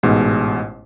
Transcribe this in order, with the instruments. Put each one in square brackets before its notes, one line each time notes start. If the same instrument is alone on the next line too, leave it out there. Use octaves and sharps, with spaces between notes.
[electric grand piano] A1 G#2 B2 G#3